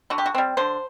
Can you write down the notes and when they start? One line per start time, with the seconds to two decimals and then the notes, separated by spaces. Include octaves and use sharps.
0.10 D3 F#4
0.18 G4
0.26 F#4
0.35 G3 C4
0.57 D3 C5